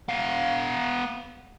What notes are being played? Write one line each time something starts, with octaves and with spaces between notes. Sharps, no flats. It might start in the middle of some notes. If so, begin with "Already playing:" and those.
B3 F5